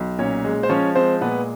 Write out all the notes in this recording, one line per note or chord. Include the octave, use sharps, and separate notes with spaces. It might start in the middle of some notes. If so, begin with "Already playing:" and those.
Already playing: B1
A#2 C#4 C#5
G#3
C5
F3 C#4 C#5
G#3 C4 C5
A#2 B3 B4